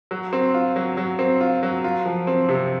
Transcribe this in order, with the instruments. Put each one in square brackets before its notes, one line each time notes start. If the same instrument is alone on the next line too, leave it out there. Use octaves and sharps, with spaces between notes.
[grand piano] F#3
C4
F4
F#3
F#3
C4
F4
F#3
F4
F3
C4
C3